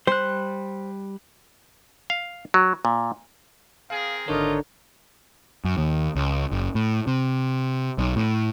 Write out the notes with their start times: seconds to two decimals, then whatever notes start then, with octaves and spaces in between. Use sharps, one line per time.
0.07 G3 C5 F#6
2.10 F5
2.54 F#3
2.85 A#2
3.90 C4 G#4 A#4 F5
4.28 G#1 D3 D4 D#4 F4 A#4 C#5 D#5
5.64 F#2
5.78 D#2
6.16 C#2
6.51 F#1
6.75 A2
7.07 C3
7.98 B1
8.16 A2